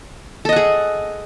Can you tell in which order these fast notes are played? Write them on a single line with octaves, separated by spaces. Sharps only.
A4 D#5 F#5 G#4